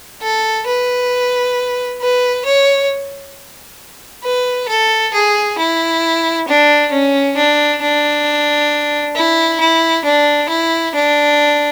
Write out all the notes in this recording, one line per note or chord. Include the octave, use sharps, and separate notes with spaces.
A4
B4
B4
C#5
B4
A4
G#4
E4
D4
C#4
D4
D4
E4
E4
D4
E4
D4